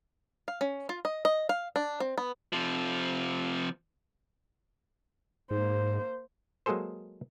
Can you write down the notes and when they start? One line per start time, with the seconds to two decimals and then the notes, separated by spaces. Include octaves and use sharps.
0.48 F5
0.61 C#4
0.89 F4
1.05 D#5
1.25 D#5
1.49 F5
1.76 D4
2.00 C4
2.18 B3
2.53 C3 F3
5.51 G#2 A#3 C5
6.66 F#3 G#3 A#3 G#4 A4 C5